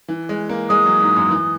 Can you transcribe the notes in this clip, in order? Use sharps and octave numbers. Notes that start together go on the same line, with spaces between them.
E3
G#3
A#3
G#3 D#6
F#3
G#2
F#2
E3